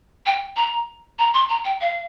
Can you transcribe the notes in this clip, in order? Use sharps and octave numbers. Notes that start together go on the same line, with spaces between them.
G5
A#5
A#5
C6
A#5
G5
F5